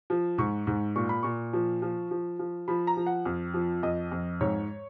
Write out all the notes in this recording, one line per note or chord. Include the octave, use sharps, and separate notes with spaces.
F3
G#2 C#6
G#2
A#2 C#6
B5
A#2 C#6
F3
F3
F3
F3
F3 B5
A#5
F3
F#5
F2
F3
F2 D#5
F2
G#2 C#5